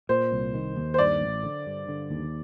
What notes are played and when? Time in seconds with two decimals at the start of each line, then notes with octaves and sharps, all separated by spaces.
0.09 A#2 C5
0.32 C2
0.54 D#3
0.76 D#2
0.94 C5
0.98 G2 D5
1.21 A1
1.43 D3
1.66 G2
1.88 D3
2.10 D#2